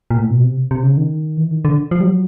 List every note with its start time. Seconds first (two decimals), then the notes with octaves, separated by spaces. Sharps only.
0.11 A#2
0.17 A2
0.30 B2
0.43 C3
0.71 C3
0.83 C#3
0.97 D#3
1.37 E3
1.51 D#3
1.65 D3
1.91 F3
2.00 G3
2.04 F#3